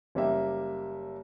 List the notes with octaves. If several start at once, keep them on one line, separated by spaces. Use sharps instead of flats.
F#1 G3 A#3 G4 E5